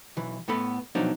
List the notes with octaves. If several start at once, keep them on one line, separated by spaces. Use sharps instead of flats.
B1 E3
A2 B3 A4 B5
B2 F3 F#3 B3 D4 D#4